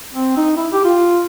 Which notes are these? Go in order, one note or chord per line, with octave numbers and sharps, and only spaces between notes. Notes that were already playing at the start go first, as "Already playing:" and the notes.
C4
D#4
E4
G4
F4